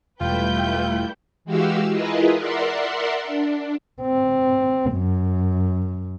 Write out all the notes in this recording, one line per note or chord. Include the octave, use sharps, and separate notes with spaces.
E1 G3 A3 E4 F4 B4 G5 G6
E3 G#3 F#4 G4 F5 E6
E4 F4 G#4 A#4 B4 D#5
A#4 D5 E5 F#5 C6
D4
C4
F#2